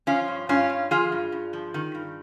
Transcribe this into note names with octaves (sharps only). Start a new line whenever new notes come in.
F3 C#4 F4
G2
G2 C#4 F4
G2
F3 F4 G#4
G2
G2
F3
D#3
G2